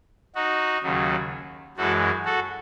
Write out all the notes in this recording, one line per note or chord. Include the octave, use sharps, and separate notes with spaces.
D#4 F#4
D#2 C#3 F#3
F#2 E3 G#3 F#4 A4
F#4 A4